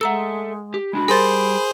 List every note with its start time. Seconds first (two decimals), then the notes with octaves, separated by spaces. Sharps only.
0.01 G#3 A4 E5 F#5 A#5 E6
0.74 G4
0.93 G#3 D4 F#4 B5
1.08 G3 G4 G#4 A#4 C5 C6 A6